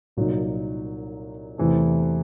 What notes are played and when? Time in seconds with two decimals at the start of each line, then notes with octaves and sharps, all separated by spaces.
0.17 C2 A#2 F#3 A#3 D#4
1.58 E2 C3 E3 A3